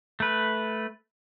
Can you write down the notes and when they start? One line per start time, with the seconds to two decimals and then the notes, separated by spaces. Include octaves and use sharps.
0.20 A3 B4